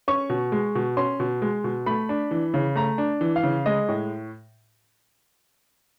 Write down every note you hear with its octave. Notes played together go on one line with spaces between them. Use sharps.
C#4 C#6
B2
G#3
B2
C#4 C6
B2
G#3
B2
A3 B5
D4
E3
C#3
A3 A#5
D4
E3
F5
C#3
G#3 D#5
A2